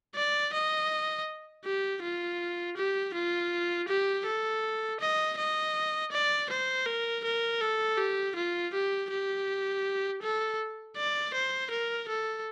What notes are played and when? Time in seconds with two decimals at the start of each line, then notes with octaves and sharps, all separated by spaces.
0.15 D5
0.54 D#5
1.65 G4
2.03 F4
2.77 G4
3.14 F4
3.88 G4
4.26 A4
5.00 D#5
5.38 D#5
6.12 D5
6.50 C5
6.86 A#4
7.25 A#4
7.61 A4
7.98 G4
8.36 F4
8.74 G4
9.10 G4
10.23 A4
10.97 D5
11.34 C5
11.71 A#4
12.09 A4